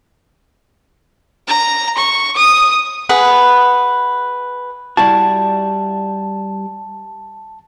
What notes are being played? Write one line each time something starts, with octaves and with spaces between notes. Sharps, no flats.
A#5
C#6
D#6
G#4 B4 F#5
G3 E4 F#4 A5